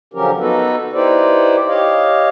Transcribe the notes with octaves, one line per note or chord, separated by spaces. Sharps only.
D3 F3 F#3 C#4 G4 A#4
B3 D#4 F#4 A4 B4
D#4 E4 G4 B4 C5 D5
G4 C#5 D#5 F5